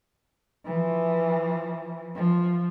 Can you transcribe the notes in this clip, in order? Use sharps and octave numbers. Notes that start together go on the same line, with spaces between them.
E3 F3
F3